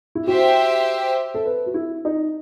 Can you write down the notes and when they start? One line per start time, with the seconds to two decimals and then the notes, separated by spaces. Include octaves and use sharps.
0.15 E4
0.27 F#4 G4 C5 E5 G5
1.34 A4
1.45 B4
1.66 F#4
1.74 E4
2.05 D#4